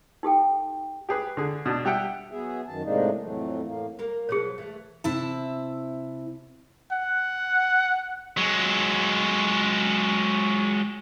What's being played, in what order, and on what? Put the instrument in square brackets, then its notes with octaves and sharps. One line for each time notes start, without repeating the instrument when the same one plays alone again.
[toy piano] D#4 G4 A4 G5
[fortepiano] G4 G#4 B4
D3 G#4
B2 D4
G3 G4 E5 F#5 G5
[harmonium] F#3 B3 G#4 E5
F#2 D#3 A5
A2 C3 G#3 A#3 D4 D#4
F2 A2 E3 F#3 A3
A2 A#3
[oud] A#3 A#4
[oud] B2 F3 F#3 [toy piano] G#4 C#5
[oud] E3 A3
[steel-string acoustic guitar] C3 E4 E5 A5
[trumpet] F#5
[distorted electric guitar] F#3 G#3